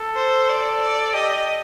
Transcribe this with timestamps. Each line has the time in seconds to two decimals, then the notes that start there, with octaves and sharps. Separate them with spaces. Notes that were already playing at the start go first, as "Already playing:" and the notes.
Already playing: A4
0.15 C5
0.49 D5
0.82 D5
1.14 G4 D#5